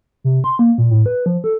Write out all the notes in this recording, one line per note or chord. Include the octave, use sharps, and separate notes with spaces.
C3
C6
A#3
A#2
A2
B4
F3
A4